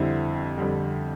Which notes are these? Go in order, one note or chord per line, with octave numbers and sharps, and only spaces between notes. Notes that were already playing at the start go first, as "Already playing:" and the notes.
Already playing: F2 D3 G3 C4 E4
F2 D3 G3